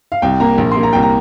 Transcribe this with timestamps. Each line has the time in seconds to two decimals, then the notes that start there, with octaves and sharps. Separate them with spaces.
0.12 F5
0.22 C2 G5
0.40 A#3 A#5
0.58 A#1
0.71 C6
0.77 A#3
0.83 A#5
0.93 C2 G5
1.03 A#5